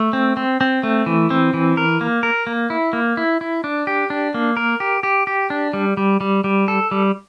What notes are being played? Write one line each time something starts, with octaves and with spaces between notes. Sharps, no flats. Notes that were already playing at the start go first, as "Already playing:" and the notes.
Already playing: A3
C4
C4
C4
A3
E3
C4
E3
A#4
A#3
A#4
A#3
E4
A#3
E4
E4
D4
G4
D4
A#3
A#4
G4
G4
G4
D4
G3
G3
G3
G3
A4
G3